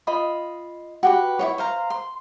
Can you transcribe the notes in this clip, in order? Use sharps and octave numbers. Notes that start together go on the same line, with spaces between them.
F4 D#5 B5 D#6
F#4 G4 B4
E4 F4 C#5
C5 F5 A#5
C6